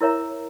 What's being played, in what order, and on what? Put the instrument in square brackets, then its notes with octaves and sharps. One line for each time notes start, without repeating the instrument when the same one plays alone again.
[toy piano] E4 A#4 C#5 E5 A#5